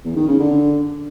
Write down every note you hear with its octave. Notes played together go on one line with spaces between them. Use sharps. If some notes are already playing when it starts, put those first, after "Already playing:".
E2
D#3
C#3
D3